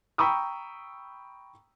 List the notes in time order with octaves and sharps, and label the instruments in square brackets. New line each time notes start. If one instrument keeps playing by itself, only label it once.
[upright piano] G5 A#5 B5 C#6 D#6 E6